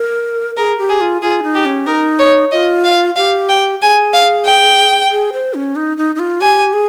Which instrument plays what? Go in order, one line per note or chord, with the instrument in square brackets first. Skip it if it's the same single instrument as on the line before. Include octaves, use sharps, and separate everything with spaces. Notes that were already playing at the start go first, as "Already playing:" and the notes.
Already playing: [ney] A#4
[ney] G#4 [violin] A#4
[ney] G4
[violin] G#4
[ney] F4
[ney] F4 [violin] G#4
[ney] D#4
[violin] G4
[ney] C#4
[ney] D#4 [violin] A#4
[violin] C#5
[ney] F4 [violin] D#5
[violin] F5
[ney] G4 [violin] F5
[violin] G5
[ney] G#4 [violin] G#5
[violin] F5
G5
[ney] G#4
C5
C#4
D#4
D#4
D#4
F4
[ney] G4 [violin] G#5
[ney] G#4